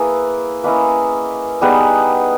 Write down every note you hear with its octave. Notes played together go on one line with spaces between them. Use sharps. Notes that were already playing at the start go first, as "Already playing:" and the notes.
Already playing: A#3 E4 G#4 B4
A#3 C#4 E4 B4 D#5
G3 B3 D#4 G#4 B4